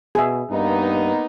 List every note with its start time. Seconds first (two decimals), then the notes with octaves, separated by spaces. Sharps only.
0.15 B2 G#4 E5
0.50 G2 A#3 B3 D#4